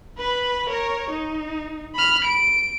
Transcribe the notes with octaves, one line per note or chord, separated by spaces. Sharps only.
B4 B5
A#4 C#5
D#4
B5 F6
D7